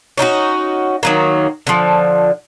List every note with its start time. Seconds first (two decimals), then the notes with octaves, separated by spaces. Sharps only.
0.18 C#4 D#4 F4 F#4
1.03 D#3 F#3 A#3
1.67 D3 F3